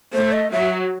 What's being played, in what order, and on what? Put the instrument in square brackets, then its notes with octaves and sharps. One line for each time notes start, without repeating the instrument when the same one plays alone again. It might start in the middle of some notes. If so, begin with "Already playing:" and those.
[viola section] A3 [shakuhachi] C5
[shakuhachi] D#5
[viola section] F#3 [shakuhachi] E5